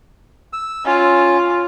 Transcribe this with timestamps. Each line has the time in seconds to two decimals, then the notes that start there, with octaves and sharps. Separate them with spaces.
0.53 E6
0.85 C#4 F4